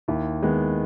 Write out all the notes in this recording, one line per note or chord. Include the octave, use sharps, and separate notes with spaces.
D#2 E4
D#3 G#3 B3